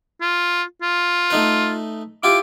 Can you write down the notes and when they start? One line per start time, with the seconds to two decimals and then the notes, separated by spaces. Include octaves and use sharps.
0.21 F4
0.82 F4
1.30 A3 D#4 B4
2.23 E4 F4 G4 D6